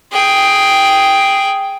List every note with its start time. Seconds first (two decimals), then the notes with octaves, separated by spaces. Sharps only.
0.12 G#4 G5